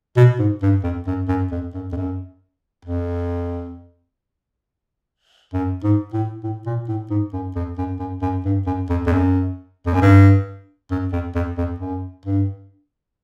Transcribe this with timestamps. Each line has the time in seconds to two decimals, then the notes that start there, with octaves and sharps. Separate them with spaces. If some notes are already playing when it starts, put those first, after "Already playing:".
0.16 B2
0.39 G#2
0.62 G2
0.84 F2
1.07 F#2
1.28 F#2
1.52 F2
1.74 F#2
1.92 F2
1.96 F#2
2.85 F2
5.53 F#2
5.83 G#2
6.13 A2
6.43 A2
6.66 A#2
6.88 A2
7.10 G#2
7.33 F#2
7.56 F2
7.78 F#2
7.99 F#2
8.22 F#2
8.45 G2
8.66 F#2
8.89 F2
9.06 F2
9.12 F#2
9.86 F2
9.94 F#2
10.02 G2
10.91 F#2
11.12 F2
11.35 F2
11.57 F2
11.80 F#2
12.25 G2